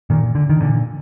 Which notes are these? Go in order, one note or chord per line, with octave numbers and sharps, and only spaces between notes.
A#2 D#3
D3
D#3
A#2 D3